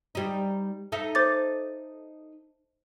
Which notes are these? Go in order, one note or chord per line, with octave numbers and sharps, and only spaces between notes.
G3 D#4
D#4 A4 E5
C5 D6 A6